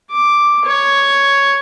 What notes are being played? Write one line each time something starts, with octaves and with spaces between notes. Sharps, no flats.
D6
C#5